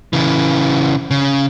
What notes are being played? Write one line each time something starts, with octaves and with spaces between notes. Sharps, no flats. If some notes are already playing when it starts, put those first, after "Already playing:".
C#3 E3
C#3